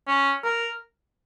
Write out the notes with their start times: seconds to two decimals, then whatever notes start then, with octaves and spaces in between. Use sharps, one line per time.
0.07 C#4
0.44 A#4